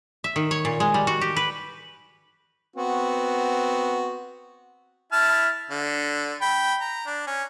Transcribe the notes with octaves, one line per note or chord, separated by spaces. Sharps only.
E5
D#3
C#5
A#2
G#3
G3
F#4
G4
B4
B3 C4 F#4
E4 A5 F6
D3
G5 B5
A#5
D4
C#4